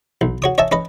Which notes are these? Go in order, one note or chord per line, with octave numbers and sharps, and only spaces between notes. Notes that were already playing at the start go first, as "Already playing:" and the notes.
B1
F#4 C#5 D#6
C#5 D#5 E5 G#5 A5
C#4 B4 D#5